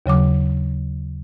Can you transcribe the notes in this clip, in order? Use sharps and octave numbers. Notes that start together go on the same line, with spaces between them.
D#2 C#3 F#3 D6